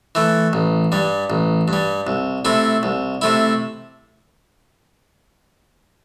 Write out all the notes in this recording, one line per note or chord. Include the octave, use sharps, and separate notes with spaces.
E3 A3
A1
G2 G3
A1
G2
G3
C2
C3 A3 E4
C2
C3 A3 E4